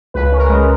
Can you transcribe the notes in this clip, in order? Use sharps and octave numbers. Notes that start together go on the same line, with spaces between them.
C#2 B4
C#4
A#4
G#3